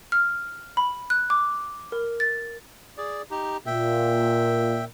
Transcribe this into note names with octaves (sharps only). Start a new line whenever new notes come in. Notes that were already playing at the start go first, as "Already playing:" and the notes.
F6
B5
F#6
D6
A#4
A6
G#4 D5
D#4 G4
A#2 E5 G5